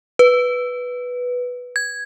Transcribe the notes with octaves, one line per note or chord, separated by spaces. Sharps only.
B4
G#6